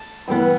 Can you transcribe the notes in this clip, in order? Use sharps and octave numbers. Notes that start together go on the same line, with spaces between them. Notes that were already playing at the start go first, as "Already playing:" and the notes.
Already playing: A5
G2 E3 G3 B3